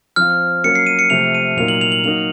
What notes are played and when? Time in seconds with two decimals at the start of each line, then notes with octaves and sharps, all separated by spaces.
0.16 F3 C4 F4 F6
0.64 F#3 A#3 C#4 C#7
0.75 C7
0.87 D#7
0.99 C#7
1.10 C3 F3 A3 F7
1.35 D#7
1.57 A#2 F#3 A#3 D#4 F7
1.68 F#7
1.81 F7
1.92 F#7
2.04 F#3 A#3 D#4 F#4 F7